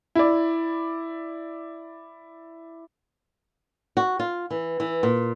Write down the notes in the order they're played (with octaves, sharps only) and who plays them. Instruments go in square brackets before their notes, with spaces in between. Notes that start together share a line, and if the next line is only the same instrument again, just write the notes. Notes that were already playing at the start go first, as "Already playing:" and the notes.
[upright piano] E4 D5
[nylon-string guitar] F#4
F4
E3
E3
A#2